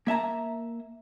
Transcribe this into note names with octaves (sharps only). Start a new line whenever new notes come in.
A#3 E5 A5 A#5